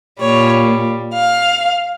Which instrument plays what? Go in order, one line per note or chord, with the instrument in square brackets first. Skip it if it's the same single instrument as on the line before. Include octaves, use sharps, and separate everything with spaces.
[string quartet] A#2 G3 C#5
F5